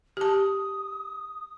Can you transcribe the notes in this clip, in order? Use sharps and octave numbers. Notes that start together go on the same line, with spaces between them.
G4 A5 D#6